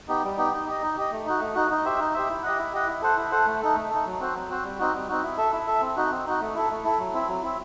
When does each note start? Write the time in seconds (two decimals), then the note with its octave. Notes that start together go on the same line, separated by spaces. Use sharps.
0.08 B3 D#4 G4
0.24 G3
0.37 B3 D#4 G4
0.53 D#4
0.67 G4 D#5
0.82 D#4
0.97 G4 D#5
1.12 A3
1.26 D#4 F#4
1.40 A3
1.55 D#4 F#4
1.71 D#4
1.85 G4 C5 E5
1.99 D#4
2.14 G4 C5 E5
2.29 E4
2.43 G4 D#5 F#5
2.58 E4
2.73 G4 D#5 F#5
2.87 E4
3.02 A4 C5 F#5
3.17 E4
3.31 A4 C5 F#5
3.46 A3
3.61 D#4 A4
3.75 A3
3.90 D#4 A4
4.05 F#3
4.20 C4 F#4 C5
4.35 F#3
4.49 C4 F#4 C5
4.64 G3
4.79 C4 D#4 F#4
4.93 G3
5.08 C4 D#4 F#4
5.23 E4
5.37 A4 E5
5.52 E4
5.67 A4 E5
5.81 C4
5.96 D#4 F#4
6.11 C4
6.26 D#4 F#4
6.40 A3
6.55 E4 A4
6.69 A3
6.84 E4 A4
6.99 F#3
7.14 C4 E4
7.28 F#3
7.43 C4 E4